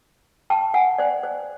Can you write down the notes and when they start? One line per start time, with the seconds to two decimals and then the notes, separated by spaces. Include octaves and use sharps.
0.50 G5 A5
0.74 F#5 G#5
0.98 C5 D5
1.23 C5